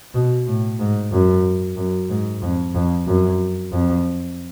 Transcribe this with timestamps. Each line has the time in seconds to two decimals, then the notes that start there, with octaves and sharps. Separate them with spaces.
0.14 B2
0.46 A2
0.79 G#2
1.12 F#2
1.77 F#2
2.09 G#2
2.42 F2
2.74 F2
3.07 F#2
3.72 F2